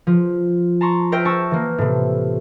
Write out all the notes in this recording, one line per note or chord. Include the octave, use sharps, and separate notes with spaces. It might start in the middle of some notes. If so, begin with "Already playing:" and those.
F3
A5 A#5 C6 C#6
A#4 C5 E5 G5
G5 A5 C#6 E6 A#6 E7
E3 A#3
A2 C3